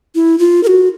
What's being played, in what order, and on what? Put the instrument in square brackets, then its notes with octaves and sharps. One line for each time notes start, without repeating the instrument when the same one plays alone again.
[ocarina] E4
F4
A#4
F#4